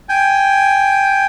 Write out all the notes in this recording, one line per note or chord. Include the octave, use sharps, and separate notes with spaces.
G5 G#5